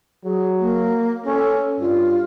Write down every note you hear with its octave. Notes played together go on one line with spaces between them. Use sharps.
F#3 G#4
A#3
C#4 A4
G2 F4